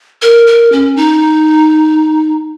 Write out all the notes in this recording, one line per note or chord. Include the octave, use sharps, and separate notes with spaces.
A#4
A#4
C#4
D#4